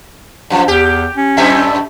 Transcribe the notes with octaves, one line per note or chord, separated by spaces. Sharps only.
F#2 F3
E2 G4
C#4
F#2 A2 E5